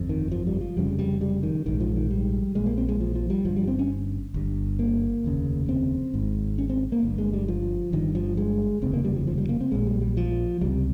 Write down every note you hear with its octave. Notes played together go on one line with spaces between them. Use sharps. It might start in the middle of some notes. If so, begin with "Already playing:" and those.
Already playing: G1 F2
D#3
F3
G3
F3
F1 F2 C#3 G3
G3
G3
D#3
A#1 G#2 D#3
F3
D#3
G3
A#1 A#2 G#3
A#3
C4
G#3
F3
F3
G3
G1 G2 F3
G3
C4
C#4
G1 G2
A#3
F1 D#2 C#3
C4
G#1 G#2
C#4
C4
A#3
G1 G2
G#3
G3
F3
G1 G2 D#3
F3
G#3
F1 D#2 C#3 C4
A#3
G3
F3
F3
G3
A#3
C4
A#1 A#2 G#3
G3
G3
F3
C#2 C3 G3